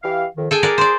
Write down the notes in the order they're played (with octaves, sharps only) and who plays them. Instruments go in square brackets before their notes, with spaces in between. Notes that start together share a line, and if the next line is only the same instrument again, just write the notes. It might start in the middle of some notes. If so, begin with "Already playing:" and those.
[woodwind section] E3 G4 F5
F2 D#3
[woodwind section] G#4 [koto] A4 G5 G#5
[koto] A#4 D5 F#5
C5 D5